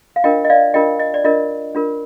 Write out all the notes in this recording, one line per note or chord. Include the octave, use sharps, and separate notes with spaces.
F5
D4 F4 A#4 D#5 G5
D#5
D5 F5
D4 F4 A#4 D#5 G5
D#5
D5
D4 F4 A#4 D#5
D4 F4 A#4